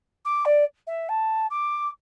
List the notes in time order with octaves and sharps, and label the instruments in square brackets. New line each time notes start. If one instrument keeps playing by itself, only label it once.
[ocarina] D6
D5
E5
A5
D6